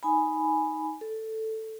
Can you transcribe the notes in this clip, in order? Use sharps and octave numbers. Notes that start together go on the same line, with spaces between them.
D#4 G#5 B5
A4